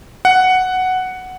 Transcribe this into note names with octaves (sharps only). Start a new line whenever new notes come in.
F#5